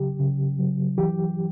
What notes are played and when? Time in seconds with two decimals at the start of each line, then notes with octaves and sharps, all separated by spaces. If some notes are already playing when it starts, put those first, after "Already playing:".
Already playing: C#3 F#3 G4
0.19 C#3
0.59 F#3
0.98 E3 G4